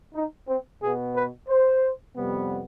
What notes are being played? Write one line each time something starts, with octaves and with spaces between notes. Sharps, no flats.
D#4
C4
B2 B3 G#4
B4
C5
F2 C3 G3 B3